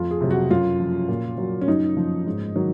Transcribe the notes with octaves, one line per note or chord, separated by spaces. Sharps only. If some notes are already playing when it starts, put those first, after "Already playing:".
Already playing: F2 F4
G#4
C3 F#3
F#4
F#2 F4
F3
A#2
F#3
C#4
F#2 D#4
F3
G#2
D#3 F#3